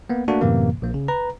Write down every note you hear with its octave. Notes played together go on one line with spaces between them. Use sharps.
A#3 B3
A3 A#3 D4 F#4
F#2 A2 C3 E3 A#3
A#1 A#3
C#3
B4 A#5